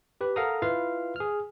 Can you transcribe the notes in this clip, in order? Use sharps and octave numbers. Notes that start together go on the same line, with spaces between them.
G4 B4
A4 A#4 F5 F#5 A#5 D#6
E4 F4 B4 F5
G#4 F6